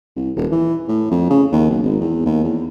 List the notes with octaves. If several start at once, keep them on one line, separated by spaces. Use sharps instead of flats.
C2
D#1
E3
A2
F2
C#3
D#2
B1
G#1
E2
D#2
E2